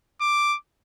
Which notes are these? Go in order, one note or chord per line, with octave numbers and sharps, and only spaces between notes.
D6